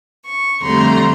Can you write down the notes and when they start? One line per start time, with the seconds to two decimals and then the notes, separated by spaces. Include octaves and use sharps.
0.25 C#6
0.63 F2 D3 G3 A3 A#5 C6